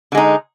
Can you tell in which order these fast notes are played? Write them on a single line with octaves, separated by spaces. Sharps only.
D3 G#3 D#4